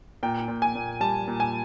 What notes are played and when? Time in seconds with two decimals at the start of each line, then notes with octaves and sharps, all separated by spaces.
0.23 A#2 G5
0.48 A#2
0.62 G#5
0.75 A#2
1.00 G3 A5
1.28 A#2
1.40 G#5